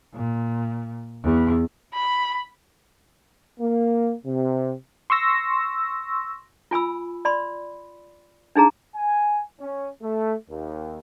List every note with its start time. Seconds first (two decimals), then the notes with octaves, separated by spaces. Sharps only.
0.14 A#2
1.24 E2
1.94 B5
3.60 A#3
4.25 C3
5.10 C6 C#6 E6 A#6
6.71 F4 G#5 B5 E6
7.25 D5 B5 C6
8.56 D4 D#4 G#4 A#5
8.95 G#5
9.60 C#4
10.02 A3
10.50 D#2